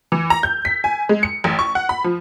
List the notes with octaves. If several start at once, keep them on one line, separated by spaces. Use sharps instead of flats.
E3
A#5
G6
B6
G#5
G#3
C#7
A1
C#6
F#5
B5
F3